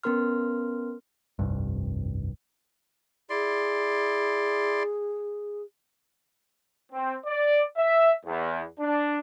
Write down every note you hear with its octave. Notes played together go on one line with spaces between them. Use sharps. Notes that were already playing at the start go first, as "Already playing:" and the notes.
B3 C#4 A#4 C6 F6
F1 C2 G2
E4 G#4 D5 C6
C4
D5
E5
E2
D4